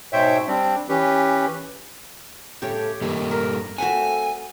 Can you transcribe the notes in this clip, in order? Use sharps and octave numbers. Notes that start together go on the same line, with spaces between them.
G#2 B2 C5 C#5 E5 G5
G3 C4 D4
E3 C#4 G4 B4
A2 C#3 A3 G4 C#5
G2 G3 A3 A#3
A#4
A3 B3 C4 F#4 E5 F#5 G#5